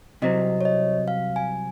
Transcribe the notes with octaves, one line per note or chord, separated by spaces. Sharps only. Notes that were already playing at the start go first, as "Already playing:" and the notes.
C2 C3 F#3 C4 D#5
C#5
D#5
F5
G#5